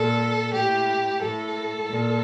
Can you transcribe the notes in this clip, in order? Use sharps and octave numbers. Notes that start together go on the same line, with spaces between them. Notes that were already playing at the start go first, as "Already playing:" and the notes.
Already playing: A#2 A4
A2 G4
A2 A4
A#2